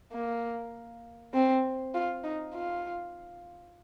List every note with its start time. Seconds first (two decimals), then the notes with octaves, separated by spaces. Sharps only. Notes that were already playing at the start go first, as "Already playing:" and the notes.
0.13 A#3
1.34 C4
1.95 F4
2.24 D#4
2.54 F4